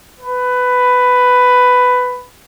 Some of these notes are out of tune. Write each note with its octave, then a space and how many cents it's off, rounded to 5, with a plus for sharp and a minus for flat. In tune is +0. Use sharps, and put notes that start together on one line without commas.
B4 +10